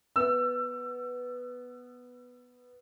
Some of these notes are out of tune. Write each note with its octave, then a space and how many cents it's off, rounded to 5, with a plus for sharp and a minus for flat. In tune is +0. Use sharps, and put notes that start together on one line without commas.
B3 +0 E6 +25